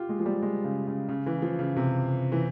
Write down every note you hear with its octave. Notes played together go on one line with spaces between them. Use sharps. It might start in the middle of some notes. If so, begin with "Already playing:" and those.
Already playing: F4 G4
G#3
F3
G3
G#3
C#3
C#3
C#3
E3
F3
C#3
C3
E3